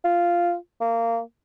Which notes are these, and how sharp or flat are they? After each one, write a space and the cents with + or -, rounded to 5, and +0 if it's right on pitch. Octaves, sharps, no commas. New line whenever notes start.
F4 -5
A#3 -20